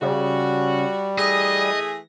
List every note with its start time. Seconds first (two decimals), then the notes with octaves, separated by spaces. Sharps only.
0.02 C#3 G3 F#4
1.18 E3 A3 G#4 D#5 A#6